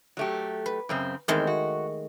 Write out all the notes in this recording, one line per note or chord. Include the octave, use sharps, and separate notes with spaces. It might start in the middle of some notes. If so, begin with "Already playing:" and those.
F#3 A3 G4
B4
F#2 C#3 C4
E2 D#3 G#3 A3 C4
F#4